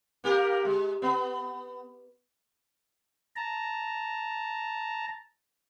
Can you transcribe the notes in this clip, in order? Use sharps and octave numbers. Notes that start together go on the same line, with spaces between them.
A#3 G4 A#4
G#3
B3
A5 A#5